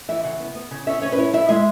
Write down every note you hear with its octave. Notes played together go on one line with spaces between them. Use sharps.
E3 E5
C#3 F#5
B3
B3
C#3
C#4 E5
C#4 C#5
B4
E4 C#5
E4 E5
G#3 E5